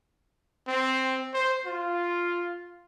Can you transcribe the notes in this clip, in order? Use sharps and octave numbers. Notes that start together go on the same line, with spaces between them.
C4
C5
F4